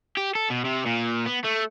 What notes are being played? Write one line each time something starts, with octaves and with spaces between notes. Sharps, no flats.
G4
A4
B2
C3
A#2
B3
A3